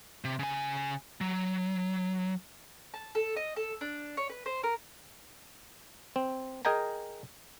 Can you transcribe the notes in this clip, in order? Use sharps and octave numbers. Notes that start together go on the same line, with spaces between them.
C3
C#3 G#5
F#3
A5
A4
D#5
A4
D4
C#5
B4
C5
A#4
C4
G#4 A#4 D#5 G5 G#5 A#5